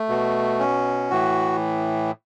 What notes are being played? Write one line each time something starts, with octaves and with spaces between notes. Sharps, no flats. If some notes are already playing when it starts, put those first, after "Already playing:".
Already playing: A3
B2
C#4
A2 E3 F#4